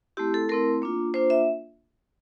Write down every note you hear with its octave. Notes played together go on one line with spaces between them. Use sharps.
A3 C4 E4 G4
A4
A3 C4 E4 A#4
A#3 D4 F4
A#3 D4 F4 C5
E5